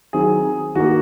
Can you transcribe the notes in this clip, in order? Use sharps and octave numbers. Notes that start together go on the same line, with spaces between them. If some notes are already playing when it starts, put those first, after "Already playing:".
D#3 F#3 C4 G#4
D#3 A#3 F#4